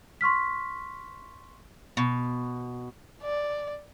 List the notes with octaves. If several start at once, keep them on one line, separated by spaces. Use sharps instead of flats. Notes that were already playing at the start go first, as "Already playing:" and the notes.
C6 C#6 F6 B6
B2
D5